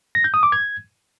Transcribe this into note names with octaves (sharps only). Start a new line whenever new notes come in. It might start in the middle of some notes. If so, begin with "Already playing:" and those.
A#6
G6
D#6
D6
G#6